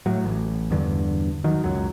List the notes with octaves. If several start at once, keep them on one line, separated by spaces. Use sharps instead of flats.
A2 F#3
A1
E2 G2 D3
D#3 F#3
C#2 F#2 F#3